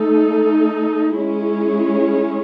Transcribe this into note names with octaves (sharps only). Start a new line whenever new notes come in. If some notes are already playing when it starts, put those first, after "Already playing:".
Already playing: A3 D#4 A4
G#3 C#4 E4 G#4 C#5